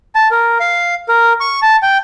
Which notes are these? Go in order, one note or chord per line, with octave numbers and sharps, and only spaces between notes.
A5
A#4
F5
A#4
C#6
A5
G5